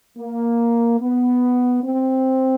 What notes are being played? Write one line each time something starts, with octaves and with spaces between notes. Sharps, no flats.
A#3
B3
C4